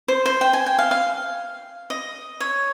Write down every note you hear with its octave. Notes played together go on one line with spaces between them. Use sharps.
C5
C5
G5
G#5
G5
F5
F5
D#5
C#5